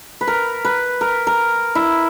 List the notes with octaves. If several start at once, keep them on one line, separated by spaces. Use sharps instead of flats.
B4
A#4
B4
A#4
A#4
E4